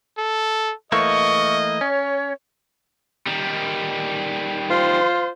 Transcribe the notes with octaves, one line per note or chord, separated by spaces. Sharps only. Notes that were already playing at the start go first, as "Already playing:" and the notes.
A4
E3 A3 A#3 D#5 C#6
C#4 C#5
D#3 G3
F4 C5